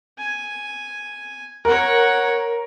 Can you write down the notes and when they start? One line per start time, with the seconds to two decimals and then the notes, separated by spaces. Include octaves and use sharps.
0.18 G#5
1.65 A#4 C#5 F#5